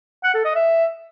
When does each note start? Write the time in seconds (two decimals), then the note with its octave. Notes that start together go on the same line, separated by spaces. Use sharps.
0.24 F#5
0.34 A4
0.45 D#5
0.55 E5